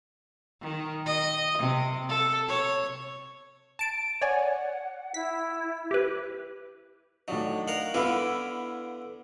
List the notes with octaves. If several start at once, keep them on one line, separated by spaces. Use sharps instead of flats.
D#3
D#5
C3
A4
C#5
A5 D7
C#5 D5 F#5 G#5
E4 B6
G4 B4
A2 F#3 D4 D#4
A#4 F5 F#5
D3 B3 E4 D5 F5 B5